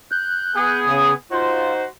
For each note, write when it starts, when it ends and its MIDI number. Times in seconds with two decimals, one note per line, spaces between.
0.12 0.80 90
0.12 0.80 91
0.56 1.13 59
0.56 1.13 68
0.86 1.14 49
0.86 1.14 87
1.32 1.85 63
1.32 1.73 65
1.32 1.85 66
1.32 1.85 72